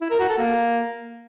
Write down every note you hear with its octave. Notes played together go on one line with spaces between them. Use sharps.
E4
A#4
F#4
A4
A#3